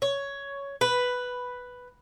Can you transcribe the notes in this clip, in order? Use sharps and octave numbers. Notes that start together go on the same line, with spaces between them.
C#5
B4